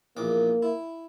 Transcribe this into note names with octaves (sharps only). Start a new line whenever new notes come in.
A#1 E2 A#3 D6
E4